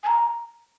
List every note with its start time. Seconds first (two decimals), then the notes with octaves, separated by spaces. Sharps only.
0.03 G#5
0.07 A#5